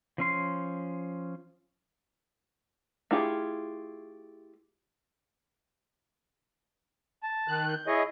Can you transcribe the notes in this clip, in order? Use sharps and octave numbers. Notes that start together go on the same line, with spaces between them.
F3 C#4 C6
A3 E4 F4 G4 G#4
A5
D#3 F#6
G6
E4 G#4 C#5 D#5